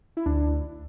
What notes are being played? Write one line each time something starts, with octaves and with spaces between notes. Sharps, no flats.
E4
D2 D4